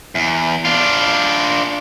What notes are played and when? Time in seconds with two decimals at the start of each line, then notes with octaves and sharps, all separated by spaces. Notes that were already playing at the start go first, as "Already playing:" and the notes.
0.15 E2
0.65 D4 F4